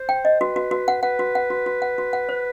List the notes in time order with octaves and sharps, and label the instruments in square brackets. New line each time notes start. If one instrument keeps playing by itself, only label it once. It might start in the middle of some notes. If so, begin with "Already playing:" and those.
Already playing: [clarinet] C5
[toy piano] G5
D#5
[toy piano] F#4 [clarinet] B4
[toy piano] F#4
F#4
F#5
[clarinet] B4 [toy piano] F#5
[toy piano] F#4
F#5
F#4
F#4
F#5
F#4
F#5
C5